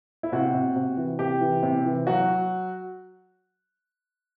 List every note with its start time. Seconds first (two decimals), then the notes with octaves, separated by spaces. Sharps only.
0.23 E4
0.32 C3 F#4
0.54 C3
0.76 C3
0.97 E3
1.19 C3 G4
1.41 E3
1.63 C3
1.86 E3
2.07 F#3 F#4
2.29 F#3